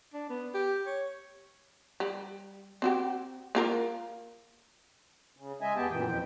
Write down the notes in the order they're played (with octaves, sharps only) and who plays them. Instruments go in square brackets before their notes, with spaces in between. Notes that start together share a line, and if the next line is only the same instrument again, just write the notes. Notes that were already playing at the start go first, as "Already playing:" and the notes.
[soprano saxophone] D4
B3
G4
C#5
[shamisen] G3
C4 F#4 G4
A#3 F4 A#4
[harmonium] C#3
G#3 D#5 E5 G#5
E2 B3 G4 G#4 G5 A5
F#2 A#2 E3 G5
F2 B2 F3 G5